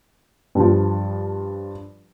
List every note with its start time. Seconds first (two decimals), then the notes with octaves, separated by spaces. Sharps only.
0.55 G2 F3